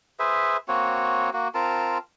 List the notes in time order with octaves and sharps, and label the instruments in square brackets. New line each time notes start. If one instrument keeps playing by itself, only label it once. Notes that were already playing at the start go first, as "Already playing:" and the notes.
[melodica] G#4 B4 C5 E5
A#3 C4 F#4 C#5
A#3 F#4
C4 F4 A#4 A5